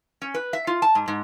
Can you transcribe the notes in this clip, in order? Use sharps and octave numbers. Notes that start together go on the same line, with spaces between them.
C#4
B4
E5
F4
A5
G#2
G#2